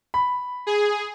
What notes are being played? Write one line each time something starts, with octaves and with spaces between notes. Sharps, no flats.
B5
G#4